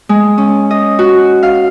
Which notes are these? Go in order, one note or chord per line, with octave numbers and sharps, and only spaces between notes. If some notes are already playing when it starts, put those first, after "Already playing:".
G#3
C#4
D#5
F#4
F5